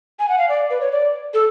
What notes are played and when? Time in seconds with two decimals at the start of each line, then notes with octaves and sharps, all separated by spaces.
0.19 G#5
0.29 F#5
0.38 F5
0.49 D5
0.70 B4
0.81 C#5
0.92 D5
1.34 A4